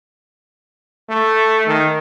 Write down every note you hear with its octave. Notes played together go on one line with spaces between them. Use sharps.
A3
D#3